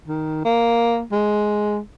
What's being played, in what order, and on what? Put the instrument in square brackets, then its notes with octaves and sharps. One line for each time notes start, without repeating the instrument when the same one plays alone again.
[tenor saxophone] D#3
A#3
G#3